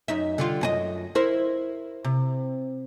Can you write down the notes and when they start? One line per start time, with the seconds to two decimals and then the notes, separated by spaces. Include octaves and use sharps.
0.08 F#2 D#4 E5
0.38 D3 G3 F4
0.61 F#2 G#4 D#5
1.15 E4 A#4 C5
2.04 C3